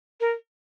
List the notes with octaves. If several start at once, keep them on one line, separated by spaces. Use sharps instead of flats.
A#4